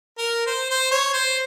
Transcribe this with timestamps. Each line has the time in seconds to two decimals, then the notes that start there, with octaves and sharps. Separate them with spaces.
0.18 A#4
0.47 C5
0.70 C5
0.91 C#5
1.14 C5